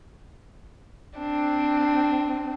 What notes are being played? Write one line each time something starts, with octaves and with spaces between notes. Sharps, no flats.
C4 D4